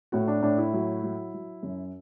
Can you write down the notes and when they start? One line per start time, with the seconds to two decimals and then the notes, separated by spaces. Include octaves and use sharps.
0.12 A2 F#4
0.28 D4
0.42 A2 D4
0.58 E4
0.73 F#3
1.03 F#3
1.34 F#3
1.63 F#2